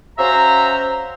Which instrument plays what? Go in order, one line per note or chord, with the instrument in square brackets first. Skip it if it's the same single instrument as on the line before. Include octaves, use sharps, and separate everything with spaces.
[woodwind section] C#4 F#4 C5 E5 F5 A#5